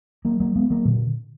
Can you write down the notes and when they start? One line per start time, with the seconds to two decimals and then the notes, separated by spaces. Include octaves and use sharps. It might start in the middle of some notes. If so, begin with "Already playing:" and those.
0.25 F#3 A#3
0.40 F#3 A#3
0.55 G#3 B3
0.70 F#3 A#3
0.85 A#2 D3